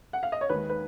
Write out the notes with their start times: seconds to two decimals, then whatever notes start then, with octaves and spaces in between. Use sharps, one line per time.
0.13 F#5
0.23 F5
0.32 D#5
0.41 C#5
0.49 D#2 D#3 G#3 B4
0.70 B4